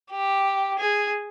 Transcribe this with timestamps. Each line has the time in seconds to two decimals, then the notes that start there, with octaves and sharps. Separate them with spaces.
0.12 G4
0.79 G#4